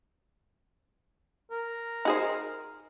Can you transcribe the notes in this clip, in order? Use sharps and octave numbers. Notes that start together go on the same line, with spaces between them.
A#4
D#4 G#4 C5